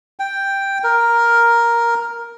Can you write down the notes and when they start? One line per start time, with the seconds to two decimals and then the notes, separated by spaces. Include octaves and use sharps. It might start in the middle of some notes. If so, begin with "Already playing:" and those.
0.20 G5
0.84 A#4